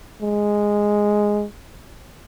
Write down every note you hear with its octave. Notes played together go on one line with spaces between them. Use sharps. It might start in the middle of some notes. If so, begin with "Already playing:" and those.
G#3